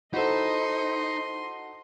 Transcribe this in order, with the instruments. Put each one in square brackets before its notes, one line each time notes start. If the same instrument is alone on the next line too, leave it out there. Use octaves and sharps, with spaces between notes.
[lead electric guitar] D#4 [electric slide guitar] E4 C5 [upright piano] F#4 A4 [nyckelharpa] D#5 C6